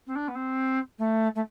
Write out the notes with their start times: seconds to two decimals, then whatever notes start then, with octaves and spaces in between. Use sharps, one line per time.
0.06 C4
0.15 D4
0.28 B3
0.35 C4
0.98 A3
1.35 A3